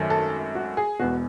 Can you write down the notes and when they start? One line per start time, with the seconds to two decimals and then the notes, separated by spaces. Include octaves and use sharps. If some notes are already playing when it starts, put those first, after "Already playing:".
Already playing: G#1 F#2 D#3 F#3 A3
0.10 A4
0.55 F#4
0.77 G#4
0.99 E1 E2 B2 F#4